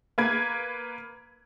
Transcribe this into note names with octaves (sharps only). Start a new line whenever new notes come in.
A#3 B4 G#6